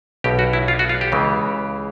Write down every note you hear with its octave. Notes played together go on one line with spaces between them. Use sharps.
B1 B2 G4
F#4
E4
F4
F#4
F4
G4
C#2 C#3 E3